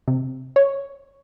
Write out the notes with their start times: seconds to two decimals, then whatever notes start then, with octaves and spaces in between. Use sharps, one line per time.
0.07 C3
0.56 C#5